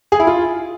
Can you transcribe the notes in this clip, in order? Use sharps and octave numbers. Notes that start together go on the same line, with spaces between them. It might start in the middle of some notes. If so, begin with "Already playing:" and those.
G#4
E4
F4